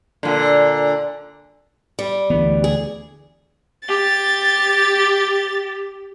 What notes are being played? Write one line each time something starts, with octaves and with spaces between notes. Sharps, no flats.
A#2 D3
G3
D2 E3 B3
G#4
G4 A6